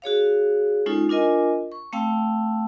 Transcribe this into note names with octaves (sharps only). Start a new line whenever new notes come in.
F#4 G#4 C#5 F5
G#3 C#4 D#4 F4 A4
D4 F4 A#4 D#5 G#5
C#6
A3 C4 F5 G5 A5 E6